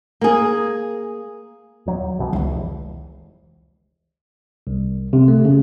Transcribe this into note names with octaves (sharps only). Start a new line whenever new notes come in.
A#3 G#4
D#1 F#3
C2 B2 E3
F1 C#2 E3
C2
C3
A3
C#3